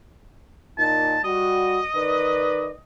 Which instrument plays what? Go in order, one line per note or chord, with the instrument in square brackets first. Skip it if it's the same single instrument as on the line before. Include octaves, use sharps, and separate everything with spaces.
[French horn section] A#2 D#4 [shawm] A5
[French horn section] G3 F#4 [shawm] D#5
[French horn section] D#3 B4 D5